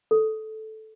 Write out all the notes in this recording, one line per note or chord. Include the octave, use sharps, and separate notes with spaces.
A4